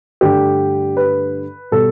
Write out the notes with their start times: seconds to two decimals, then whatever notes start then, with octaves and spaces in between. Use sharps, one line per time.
0.21 G2 D3 A3 G4
0.97 B4
1.71 B2 G3 A4